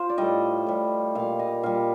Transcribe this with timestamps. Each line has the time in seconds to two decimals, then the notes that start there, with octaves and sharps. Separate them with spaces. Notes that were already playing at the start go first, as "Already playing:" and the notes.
Already playing: F4 C5
0.10 D5
0.18 A2 G3 D#5
0.67 A2 G3
1.15 A#2 G3 F5
1.39 D#5
1.63 A#2 G3 F5